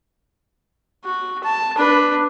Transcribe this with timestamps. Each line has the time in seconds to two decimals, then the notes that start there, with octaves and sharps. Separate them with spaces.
1.05 F#4
1.44 A5
1.76 D4 B4